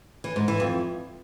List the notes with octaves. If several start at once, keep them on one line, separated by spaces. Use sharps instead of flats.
E3
G#2
E3
F2